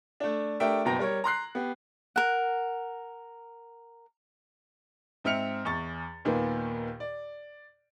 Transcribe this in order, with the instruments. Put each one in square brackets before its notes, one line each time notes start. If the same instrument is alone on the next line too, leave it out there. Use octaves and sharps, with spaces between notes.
[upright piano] A3 D4
A3 D4 G4 A#4 E5 G5
F#1 B2 B3 G5 A#5 A#6
G3 A#4 C#5
A#5 C6 F#6 C7
B3 G4
[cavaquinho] A#4 F#5
[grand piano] G#2 C4 E5 F6 C#7 F7
E2 C#6 A6
D#2 A#2 D#3 B3
D5